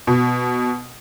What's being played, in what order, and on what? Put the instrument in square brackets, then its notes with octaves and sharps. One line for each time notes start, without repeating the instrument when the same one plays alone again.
[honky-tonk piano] B2